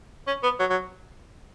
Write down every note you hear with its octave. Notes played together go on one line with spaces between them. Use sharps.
C#4
B3
F#3
F#3